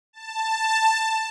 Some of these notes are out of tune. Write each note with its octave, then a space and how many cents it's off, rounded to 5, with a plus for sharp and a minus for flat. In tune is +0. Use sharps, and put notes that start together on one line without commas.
A5 +10